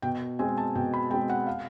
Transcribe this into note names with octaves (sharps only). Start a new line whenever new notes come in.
B2 G5
G#3 C4 G#5
A5
B2 G5
B5
G#3 C4 G5
F#5
F5